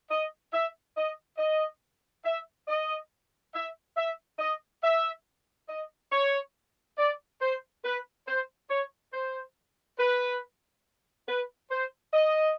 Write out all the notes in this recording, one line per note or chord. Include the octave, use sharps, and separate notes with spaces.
D#5
E5
D#5
D#5
E5
D#5
E5
E5
D#5
E5
D#5
C#5
D5
C5
B4
C5
C#5
C5
B4
B4
C5
D#5